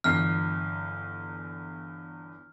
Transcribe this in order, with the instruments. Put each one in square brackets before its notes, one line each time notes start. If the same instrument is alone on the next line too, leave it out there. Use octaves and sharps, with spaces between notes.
[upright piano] G1 E2 C7 [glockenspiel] F6